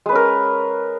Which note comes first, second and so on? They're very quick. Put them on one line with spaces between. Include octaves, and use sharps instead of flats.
G#3 B4 C#4 A#4